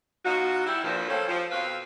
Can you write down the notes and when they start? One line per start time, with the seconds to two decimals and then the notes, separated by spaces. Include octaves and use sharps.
0.24 B2 D#4 F4 F#4
0.66 G3 E4
0.83 G2 A#2 F3
1.08 G3 A3 A#3 C#4 A4 C5
1.28 F3
1.51 F2 B2 C4 B4 F5